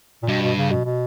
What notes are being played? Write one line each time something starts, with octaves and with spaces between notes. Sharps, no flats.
A#2
G2 B2
B2
C#3
B2
B2